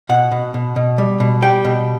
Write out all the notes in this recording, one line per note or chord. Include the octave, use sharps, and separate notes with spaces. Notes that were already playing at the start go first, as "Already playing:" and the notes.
B2 F#5
B2
B2
B2
G3
B2
G3 G5
B2